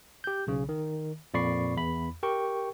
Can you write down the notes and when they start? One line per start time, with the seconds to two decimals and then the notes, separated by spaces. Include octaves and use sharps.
0.24 G4 G6
0.47 B1 C#3
0.69 D#3
1.34 F2 A#2 D5 B5 C#6 C7
1.77 E2 B5
2.23 G4 A#4 G5 C#6